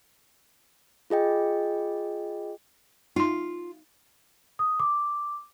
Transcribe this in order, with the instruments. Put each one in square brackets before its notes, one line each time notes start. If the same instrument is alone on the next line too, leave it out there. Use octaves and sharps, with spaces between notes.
[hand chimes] F4 G#4 D#5 G5
[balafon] D#4 C6 [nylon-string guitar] F4
[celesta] D#6
D6